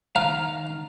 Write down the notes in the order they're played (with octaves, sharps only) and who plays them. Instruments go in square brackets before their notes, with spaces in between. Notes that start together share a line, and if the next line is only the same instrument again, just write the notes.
[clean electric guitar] D#3 A#5 [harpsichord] F5